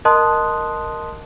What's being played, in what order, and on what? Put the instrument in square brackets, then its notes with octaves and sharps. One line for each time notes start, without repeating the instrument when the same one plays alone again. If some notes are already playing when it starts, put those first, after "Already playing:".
[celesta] A#4 D#5 A5 C6 D#6 F#6